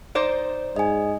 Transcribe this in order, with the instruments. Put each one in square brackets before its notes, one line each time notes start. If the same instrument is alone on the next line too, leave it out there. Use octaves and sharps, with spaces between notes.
[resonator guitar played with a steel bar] D#4 C5 D5
[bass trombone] G#2 [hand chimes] D#5 G#5